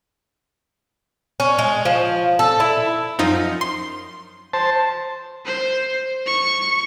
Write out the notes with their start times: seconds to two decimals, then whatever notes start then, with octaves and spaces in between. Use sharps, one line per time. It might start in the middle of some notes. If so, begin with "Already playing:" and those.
1.40 C#4
1.59 G#3
1.85 F3
2.39 A4
2.60 E4
3.19 F#2 F3 D#4
3.61 C6
4.53 C5 A5
5.46 C5
6.27 C#6